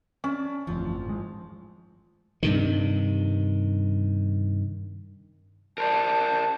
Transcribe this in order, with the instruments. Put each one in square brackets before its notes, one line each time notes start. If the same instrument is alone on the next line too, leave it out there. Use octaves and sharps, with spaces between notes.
[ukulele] C#4 [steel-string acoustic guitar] D4
[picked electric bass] G1 F2 A2 [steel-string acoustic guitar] F3
[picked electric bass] G#1 G#3
[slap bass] G2 C3 D#3
[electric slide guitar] A#4 C5 D5 [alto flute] A5